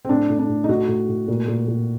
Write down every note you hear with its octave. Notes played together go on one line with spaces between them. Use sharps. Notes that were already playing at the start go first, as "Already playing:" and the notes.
C4
A2 D4
A2
D4
A2
D#4
A2 F#4
A2
A2
A#2
A#2
A#2